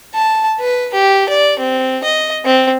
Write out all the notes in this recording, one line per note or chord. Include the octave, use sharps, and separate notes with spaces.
A5
B4
G4
D5
C4
D#5
C4